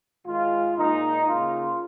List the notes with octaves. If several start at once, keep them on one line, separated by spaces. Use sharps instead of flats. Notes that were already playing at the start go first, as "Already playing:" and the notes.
G#2 D#3 G#3 F4
A#2 G#3 D#4
C#3 A#3 F4